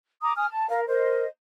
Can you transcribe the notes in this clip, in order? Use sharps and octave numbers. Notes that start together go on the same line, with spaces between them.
A#5 D6 D#6
G#5 D#6 F6
A5
A#4 F5
A#4 C5 D#5